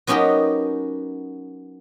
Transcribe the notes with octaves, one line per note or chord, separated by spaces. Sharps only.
F#3 B3 C#4 D#4 G4 A#4